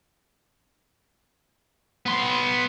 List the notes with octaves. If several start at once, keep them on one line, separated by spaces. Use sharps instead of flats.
B3 C6